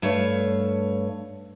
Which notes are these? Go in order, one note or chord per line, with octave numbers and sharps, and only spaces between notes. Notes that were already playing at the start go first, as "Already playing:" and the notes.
G2 A3 C#5 F5